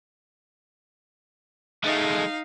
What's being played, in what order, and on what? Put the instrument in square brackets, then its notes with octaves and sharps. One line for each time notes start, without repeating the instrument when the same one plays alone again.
[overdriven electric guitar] G#3 A3 [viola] D#4 F5